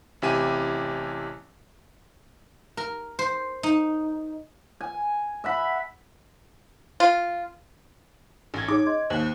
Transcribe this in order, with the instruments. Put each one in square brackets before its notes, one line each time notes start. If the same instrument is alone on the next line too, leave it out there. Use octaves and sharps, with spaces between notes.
[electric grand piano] A1 C3 E4 G4 G#5 D#7
[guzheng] A#4
C5
D#4
[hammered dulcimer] G#5
E5 F#5 B5
[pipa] F4
[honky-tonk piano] A1 G#6
[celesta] D#4 G#4 C#5 [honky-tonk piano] D6
[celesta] D#5 C6 G#6
[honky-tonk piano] D#2 [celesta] C5 F#6 F#7